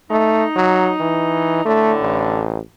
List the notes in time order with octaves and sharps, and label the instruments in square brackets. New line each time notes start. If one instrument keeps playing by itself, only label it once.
[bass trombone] A3 [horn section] D#4
[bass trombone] F#3
E3
[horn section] A2 D3 [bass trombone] A3
[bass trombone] A1